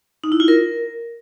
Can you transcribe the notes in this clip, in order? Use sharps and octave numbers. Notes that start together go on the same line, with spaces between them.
D#4
E4
F4
A#4